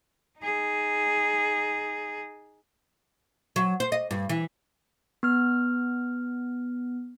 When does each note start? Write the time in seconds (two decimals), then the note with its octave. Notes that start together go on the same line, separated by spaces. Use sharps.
0.39 D#4 G#4
3.56 F#3
3.80 C5
3.92 D#5
4.11 G2
4.29 E3
5.23 B3 F6